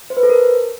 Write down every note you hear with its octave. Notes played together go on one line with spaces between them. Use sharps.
C5
B4
A4
A#4